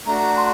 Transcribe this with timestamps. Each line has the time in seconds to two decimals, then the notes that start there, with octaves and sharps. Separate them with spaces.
0.06 A3 D4 F#4 A#5
0.37 C6